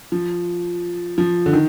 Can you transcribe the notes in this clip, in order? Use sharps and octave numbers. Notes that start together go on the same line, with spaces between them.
F3
F3
D3
D#3